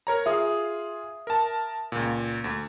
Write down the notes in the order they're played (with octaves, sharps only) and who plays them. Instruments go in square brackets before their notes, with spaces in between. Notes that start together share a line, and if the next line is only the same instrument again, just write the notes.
[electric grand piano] A#4 C#5 A#5
[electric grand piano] F4 G#4 F5 [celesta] E5 D#6
[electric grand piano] A#4 A5
C#2 A#2
D2